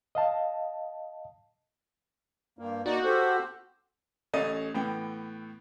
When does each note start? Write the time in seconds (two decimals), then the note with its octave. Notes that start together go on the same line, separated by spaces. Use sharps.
0.15 D#5 F5 A5
2.59 G2 A#3
2.86 A#3 D#4 F#4 D5
3.04 G4 A4 C5
4.34 A1 A3 C#4 D#5 A6 D#7
4.75 A2 E3 B3 G5